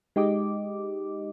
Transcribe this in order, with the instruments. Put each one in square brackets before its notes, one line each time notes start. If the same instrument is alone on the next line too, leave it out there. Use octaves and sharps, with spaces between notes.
[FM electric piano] G#3 D#4 G4 D#5 D6